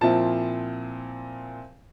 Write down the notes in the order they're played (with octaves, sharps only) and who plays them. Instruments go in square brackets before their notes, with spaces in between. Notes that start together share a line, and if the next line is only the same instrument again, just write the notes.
[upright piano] A#2 F3 C4 E4 A5